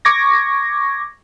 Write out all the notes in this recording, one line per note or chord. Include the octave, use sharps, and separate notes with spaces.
C#6 D6 G#6 A#6